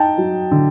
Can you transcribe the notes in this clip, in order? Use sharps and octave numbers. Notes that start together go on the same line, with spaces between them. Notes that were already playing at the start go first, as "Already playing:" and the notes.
Already playing: D#4 G5 A5
F#3
D3